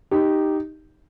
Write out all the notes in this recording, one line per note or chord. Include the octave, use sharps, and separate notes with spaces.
D#4 G4